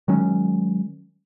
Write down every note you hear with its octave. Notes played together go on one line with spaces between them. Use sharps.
D#3 F#3 G#3 C#4